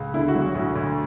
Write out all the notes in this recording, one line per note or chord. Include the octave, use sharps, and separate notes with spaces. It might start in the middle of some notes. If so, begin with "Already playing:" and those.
Already playing: C#2
D3 E4
F#4
F#3
F#4
D2
D2